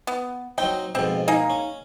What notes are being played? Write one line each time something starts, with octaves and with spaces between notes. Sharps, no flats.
B3
F#3 C4 D#4 G5
F2 G#2 B2 C4
A#3 D#4 G#4
C#4